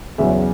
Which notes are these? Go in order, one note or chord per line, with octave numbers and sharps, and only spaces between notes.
E2 C#3 F#3 E5